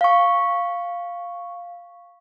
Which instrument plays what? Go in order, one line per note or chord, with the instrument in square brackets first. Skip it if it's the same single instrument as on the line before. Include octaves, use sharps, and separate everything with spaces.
[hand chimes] F5 C#6